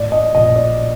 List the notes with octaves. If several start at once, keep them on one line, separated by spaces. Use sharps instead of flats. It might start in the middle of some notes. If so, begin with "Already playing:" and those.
Already playing: A2 D5
D#5
A#1 D#5
D5